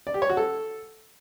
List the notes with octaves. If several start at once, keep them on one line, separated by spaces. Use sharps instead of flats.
D5
G4
C#5
F#4
A4